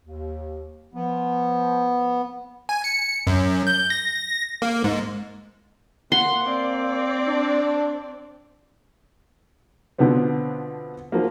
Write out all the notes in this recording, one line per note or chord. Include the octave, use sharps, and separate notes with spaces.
D#2
F3 B3
G#5
C#7
F#2
G6
A#6
A#3
G#2
A#3 F#5 C6
C4 D5
D4
B2 D3 F3 B3 C4
F3 F#3 A#3